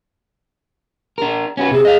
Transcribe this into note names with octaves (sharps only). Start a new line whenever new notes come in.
D4 A#4
C#4 F#4 B4
C3 C4 G#4
D#5 F5